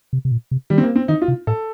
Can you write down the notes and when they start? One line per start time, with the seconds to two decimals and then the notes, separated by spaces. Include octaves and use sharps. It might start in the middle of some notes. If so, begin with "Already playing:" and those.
0.13 C3
0.25 C3
0.31 A#2
0.51 C3
0.70 D#3 G3
0.78 C4
0.83 A#3
0.96 C4
1.08 D#3 D#4
1.22 F4
1.28 C3
1.47 A2 A4